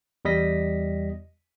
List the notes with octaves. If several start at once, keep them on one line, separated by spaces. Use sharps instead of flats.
E2 G3 D#5 A#6 B6